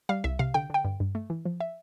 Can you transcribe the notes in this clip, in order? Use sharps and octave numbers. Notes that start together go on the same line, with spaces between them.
G3 F5
C2 E5
C3 F5
D3 G5
D3 G5
G2
G2
A3
E3
F3
E5